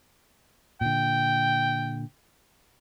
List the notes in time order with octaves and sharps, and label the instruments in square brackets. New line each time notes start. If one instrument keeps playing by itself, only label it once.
[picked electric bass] A#2 D3 [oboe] G5